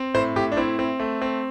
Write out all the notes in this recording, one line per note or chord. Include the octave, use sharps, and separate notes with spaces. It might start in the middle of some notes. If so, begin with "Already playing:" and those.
Already playing: C4
A2 C5
A2 G4
D4
C4 E4
C4
A3
C4